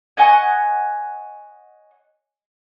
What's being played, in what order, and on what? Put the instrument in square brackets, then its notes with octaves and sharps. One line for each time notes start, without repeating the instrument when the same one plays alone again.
[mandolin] C#5 D#5 F#5 G#5